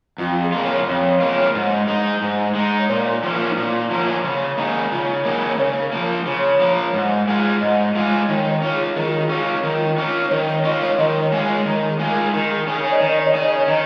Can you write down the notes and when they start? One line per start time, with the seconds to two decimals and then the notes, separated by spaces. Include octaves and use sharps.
0.18 F2 F4
0.42 G#4
0.52 C#3 A#3 F4
0.63 C#5
0.86 F2 C#5
1.20 C#3 A#3 F4
1.55 G#2
1.87 G#3 D#4
2.22 G#2
2.55 G#3
2.60 D#4
2.79 C#5
2.89 A#2 A#4
3.23 F3 A#3 C#4
3.50 D#4
3.56 A#2 F4
3.90 F3 A#3 C#4
4.24 C#3
4.58 A#3 D#4 G#4
4.91 C#3 F4
5.25 A#3 D#4 G#4
5.49 C#5
5.58 C#3 A#4
5.92 F3 A#3
6.26 C#3 C#5
6.59 F3 A#3
6.94 G#2
7.27 G#3 F4 G#4
7.61 G#2 D#5
7.95 G#3 F4 G#4
8.29 D#3 C#5
8.43 A#4
8.51 C#5
8.62 C#4 F4
8.74 G#4
8.96 D#3 G#4
9.08 F4
9.20 G#4
9.30 C#4 F4
9.63 D#3 F4
9.98 C#4 F4
10.25 C#5
10.31 D#3 A#4
10.48 C#5
10.64 C#4 F4 D#5
10.82 C#5
10.98 D#3 D#5
11.20 C#5
11.32 G#3 F4 G#4
11.44 C#5
11.66 D#3 A#4
11.88 G#4
11.99 G#3 F4 G#4
12.10 A#4
12.34 D#3 A#4
12.51 G#4
12.67 C#4 G#4 A#4
12.83 C#5
12.92 D#5
13.00 D#3 C#5
13.08 D#5
13.18 C#5
13.26 D#5
13.34 C#4 G#4 C#5
13.42 D#5
13.51 C#5
13.68 D#3 D#5